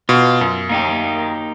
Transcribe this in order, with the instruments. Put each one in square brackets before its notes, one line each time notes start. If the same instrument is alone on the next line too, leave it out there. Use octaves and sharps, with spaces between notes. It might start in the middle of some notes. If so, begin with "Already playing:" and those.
[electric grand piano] B2 [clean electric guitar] F4
[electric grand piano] F#2
[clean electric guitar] A#3 D#4 G4